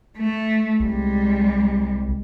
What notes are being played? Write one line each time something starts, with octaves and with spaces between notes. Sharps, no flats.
A3
C2 G3 G#3